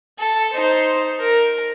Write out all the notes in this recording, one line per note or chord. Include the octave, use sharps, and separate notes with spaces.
A4
D#4 C5
A#4